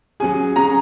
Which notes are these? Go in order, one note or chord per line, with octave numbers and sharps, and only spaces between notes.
F#3 C#4 G#4 G#5
F#3 C#4 G#4 A#5